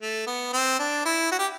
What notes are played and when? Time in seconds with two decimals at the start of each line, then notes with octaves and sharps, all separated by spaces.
0.01 A3
0.27 B3
0.53 C4
0.79 D4
1.05 E4
1.32 F#4
1.39 G4